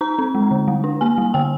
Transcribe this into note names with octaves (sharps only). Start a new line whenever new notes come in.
D#4 A#5
C4
G#3
D3
G3
D4
A#3 G#5
G3
D3 G5